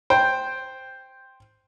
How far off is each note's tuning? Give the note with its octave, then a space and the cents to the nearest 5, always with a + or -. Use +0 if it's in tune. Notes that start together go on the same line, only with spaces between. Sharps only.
C5 +0 G5 +0